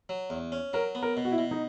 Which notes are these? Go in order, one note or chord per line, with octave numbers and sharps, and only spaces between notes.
F#3
E2
C#4
F#3 A#4
B3
A#4
B2
F#4
E4
B2
D#4